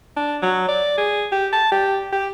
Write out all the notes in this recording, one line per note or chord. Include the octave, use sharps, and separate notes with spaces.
D4
F#3
D5
G#4
G4
A5
G4
G4